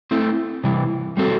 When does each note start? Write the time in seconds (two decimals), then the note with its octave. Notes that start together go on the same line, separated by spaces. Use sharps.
0.11 A3 C4 E4
0.64 C3 E3 G3
1.17 G3 C4 F#4 A4